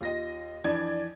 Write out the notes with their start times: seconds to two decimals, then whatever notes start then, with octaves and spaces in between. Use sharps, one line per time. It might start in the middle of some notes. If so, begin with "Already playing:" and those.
0.01 D#2 F4 D#5 A#6
0.64 F2 E3 D4 D5 G#6